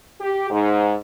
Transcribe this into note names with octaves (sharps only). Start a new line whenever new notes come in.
G4
G#2